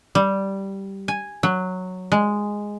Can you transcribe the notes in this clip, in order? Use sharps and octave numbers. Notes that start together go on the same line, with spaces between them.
G3
G#5
F#3
G#3